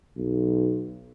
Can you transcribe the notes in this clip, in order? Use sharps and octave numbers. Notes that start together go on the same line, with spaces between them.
B1